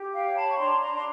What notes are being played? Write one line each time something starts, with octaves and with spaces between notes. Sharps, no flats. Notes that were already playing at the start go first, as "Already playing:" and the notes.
Already playing: G4
F5 G5
C#5
A5 B5
C#6
D4 A#5 C6
A#5 C6
D4 C6